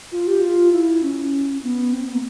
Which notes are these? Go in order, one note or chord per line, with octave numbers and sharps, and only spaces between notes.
F4
G4
F4
E4
C#4
B3
C4
B3
A#3